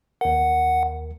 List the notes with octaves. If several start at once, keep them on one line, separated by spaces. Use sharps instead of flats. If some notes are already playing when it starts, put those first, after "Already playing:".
D#2 A#4 F#5